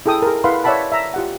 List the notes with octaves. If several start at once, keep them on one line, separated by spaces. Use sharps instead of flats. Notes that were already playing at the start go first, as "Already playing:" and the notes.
E4 G#4 A4 G5 D#6
G#4 A#4
E4 B4 F5 F#5 B5 C6
C#5 D5 E5 F#5 A5 B5
E5 A#5
F4 G4 F#5